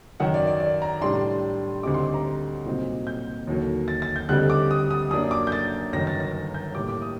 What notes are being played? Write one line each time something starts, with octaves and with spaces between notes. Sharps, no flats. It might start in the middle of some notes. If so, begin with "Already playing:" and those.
F#2 D#3 F#3 F#5
D5
D5
D5
A#5
A2 G3 D4 C6
D2 D3 G3 C4 D#4 D6
C6
D6
A#5
C2 A#2 F#3 C4 D#4
G6
D#2 D3 F#3 A#3
A6
A6
G6
D2 D3 G3 C4 D#4 F#6
D6
D#6
D#6
F#2 F#3 A#3 D4 D#6
D6
G6
A6
G1 F#2 D#3 A#6
A6
A#6
G6
A2 G3 A#3 D6
D6
D#6